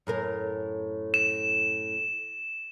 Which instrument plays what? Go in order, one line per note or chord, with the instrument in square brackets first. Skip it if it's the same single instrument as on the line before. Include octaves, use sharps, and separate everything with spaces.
[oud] F#2 A2 A#4
[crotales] E7